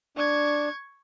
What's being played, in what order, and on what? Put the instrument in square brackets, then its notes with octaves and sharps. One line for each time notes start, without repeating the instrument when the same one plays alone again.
[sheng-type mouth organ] D4 [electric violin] C#6 G#6